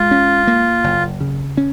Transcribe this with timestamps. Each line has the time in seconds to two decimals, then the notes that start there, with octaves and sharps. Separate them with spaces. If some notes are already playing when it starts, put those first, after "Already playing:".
Already playing: A#1 G#3 F4
0.11 C#4
0.47 A#3
0.84 F#1
1.20 C#3
1.57 C#4